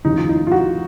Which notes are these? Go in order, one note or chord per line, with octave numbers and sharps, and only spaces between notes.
F1 D#2 C#3 D#4
F4
D#4
F4
F#4